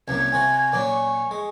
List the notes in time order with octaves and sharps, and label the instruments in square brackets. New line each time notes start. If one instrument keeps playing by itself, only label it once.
[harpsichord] C2 F#2 A#3 [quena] G#6
[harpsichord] C3 F4 F#4 [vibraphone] G#5
[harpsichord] A#2 F#3 C#4 [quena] D6
[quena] C#6
[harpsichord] G#3